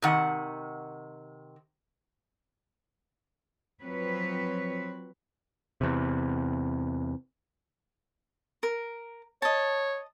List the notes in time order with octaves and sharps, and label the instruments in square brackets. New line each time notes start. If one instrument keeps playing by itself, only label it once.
[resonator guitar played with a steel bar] C3 D#3 F#5
[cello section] F3 F#3 C4 B4 C#5
[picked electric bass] E2 C3
[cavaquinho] A#4
[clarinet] C#5 [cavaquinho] D#5 A5